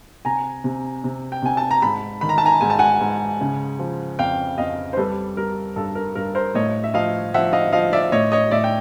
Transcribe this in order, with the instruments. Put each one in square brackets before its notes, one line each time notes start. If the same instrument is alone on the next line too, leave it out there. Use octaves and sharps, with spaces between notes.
[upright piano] C3 G#5 A#5
C3
C3
G5
C3 G#5
A5
A#5
G#2 A5 B5
D#3 B5
A#5
A5
G#5 A#5
G#2 G#5
A5
F#5 G#5
G#2
C#3
F3
F2 F5 G5
F2 D#5 F5
C5
G3 A4 B4
G3 A#4
G2 A4
A#4
G2 A#4
A#4 C5
A2 C#5 D#5
E5
F3 D#5 F5
F3 E5 F#5
D#5 F5
F3 D#5 F5
D5 E5
A2 C#5 D#5
C#5 D#5
A2 D5 E5
G5